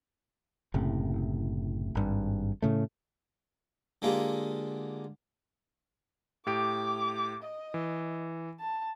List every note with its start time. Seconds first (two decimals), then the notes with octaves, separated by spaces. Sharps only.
0.74 F#1 A2 C3
1.95 G#1 G2
2.62 A2 C#3 A3
4.02 D3 G#3 A#3 F4 G4
6.46 A2 G4 D6 D7
7.43 D#5
7.74 E3
8.60 A5